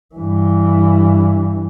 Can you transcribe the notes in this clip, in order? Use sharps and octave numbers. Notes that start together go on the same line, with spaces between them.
G2 E3